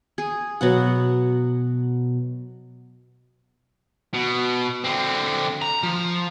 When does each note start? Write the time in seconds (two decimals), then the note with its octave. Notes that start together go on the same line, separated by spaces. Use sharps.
0.18 G#4
0.61 B2 F#3 B3 F#5
4.14 B2
4.84 D3 C4
5.62 A#5
5.83 F3